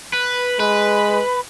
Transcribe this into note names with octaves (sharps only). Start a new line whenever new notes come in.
B4
G#3 B4